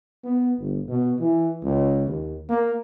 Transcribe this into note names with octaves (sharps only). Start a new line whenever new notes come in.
B3
G1
B2
E3
C#2
D#2
A#3